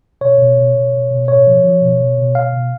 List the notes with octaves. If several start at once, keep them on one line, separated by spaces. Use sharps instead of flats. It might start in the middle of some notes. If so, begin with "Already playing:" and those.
B2 C#5
B2
B2
B2
B2
B2
A2 C#5
F3
F3
B2
B2
B2
B2 F5
B2